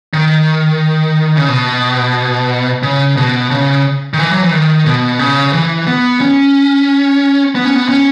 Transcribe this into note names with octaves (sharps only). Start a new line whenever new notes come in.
D#3
C#3
B2
C#3
B2
C#3
D#3
E3
F#3
E3
D#3
B2
C#3
E3
B3
C#4
B3
C#4
B3
C#4